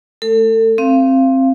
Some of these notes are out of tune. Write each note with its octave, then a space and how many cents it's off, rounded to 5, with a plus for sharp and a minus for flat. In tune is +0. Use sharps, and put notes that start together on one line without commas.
A3 -5 A4 +35
C4 +15 F5 -20